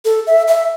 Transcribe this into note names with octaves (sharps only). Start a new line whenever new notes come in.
A4
E5
E5